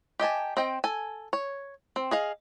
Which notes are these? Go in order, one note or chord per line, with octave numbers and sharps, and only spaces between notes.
G4 D#5 G#5 A5
C4 D#5 G5
A4 G#5
C#5
C4
G#4 D#5 F5